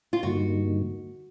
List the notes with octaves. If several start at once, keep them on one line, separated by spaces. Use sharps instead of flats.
F4
G2 D3 G3 A#3 D#4 F#4